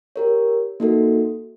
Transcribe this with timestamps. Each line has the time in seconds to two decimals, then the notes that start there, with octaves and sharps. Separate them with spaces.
0.16 G4 A#4 C#5
0.80 A#3 D#4 F#4 A4